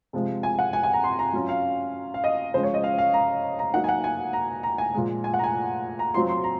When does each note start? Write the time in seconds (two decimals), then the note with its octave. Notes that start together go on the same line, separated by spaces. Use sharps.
0.13 C3 F3 G#3
0.43 G#5
0.59 F#5
0.73 G#5
0.83 G#5
0.93 A#5
1.04 C6
1.19 A#5
1.33 F#3 C#4 F4
1.49 F5
2.14 F5
2.24 D#5
2.54 C#3 F3 G#3 C5
2.63 C#5
2.74 D#5
2.84 F5
2.98 F5
3.14 A#5
3.59 A#5
3.74 F#3 A#3 D#4 F#5
3.84 G#5
3.89 F#5
4.04 G#5
4.33 A#5
4.63 A#5
4.78 G#5
4.94 A#2 F3 G#3
5.24 G#5
5.34 F#5
5.39 A#5
5.44 G#5
5.99 A#5
6.14 F#3 C4 F4 C6
6.29 C6
6.44 A#5